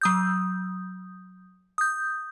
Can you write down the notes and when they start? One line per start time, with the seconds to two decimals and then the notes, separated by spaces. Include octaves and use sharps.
0.01 F#3 D#6 G6
1.78 D#6 G6